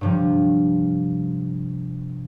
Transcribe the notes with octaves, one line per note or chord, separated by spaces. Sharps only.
G2 C3 F3